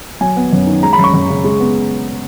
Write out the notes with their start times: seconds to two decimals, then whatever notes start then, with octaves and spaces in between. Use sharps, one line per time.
0.21 F#3 G#5
0.37 B3
0.52 F#2
0.67 D#3
0.83 G#3 A#5
0.93 B5
0.99 F#2
1.04 C#6
1.14 F#2
1.29 C#3
1.44 G#3
1.60 B3